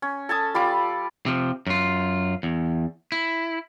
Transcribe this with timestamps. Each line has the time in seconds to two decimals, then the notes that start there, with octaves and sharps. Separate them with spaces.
0.02 C#4
0.29 A4 G#5 A5 D#6
0.54 G3 F4 B5 D6
1.26 C3 F3
1.67 F#2 F4
2.43 E2
3.12 E4